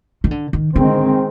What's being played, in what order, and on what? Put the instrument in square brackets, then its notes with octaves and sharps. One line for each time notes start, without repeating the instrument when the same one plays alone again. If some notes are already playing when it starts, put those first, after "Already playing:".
[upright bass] D#3
D3
D#3
[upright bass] D3 [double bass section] D#3 G#3 C4